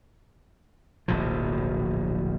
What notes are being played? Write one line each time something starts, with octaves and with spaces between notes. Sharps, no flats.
D1 A#1 B2 F3